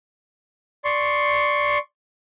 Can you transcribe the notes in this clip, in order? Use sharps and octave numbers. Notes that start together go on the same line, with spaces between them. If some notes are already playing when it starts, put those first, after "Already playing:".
D5 C6 C#6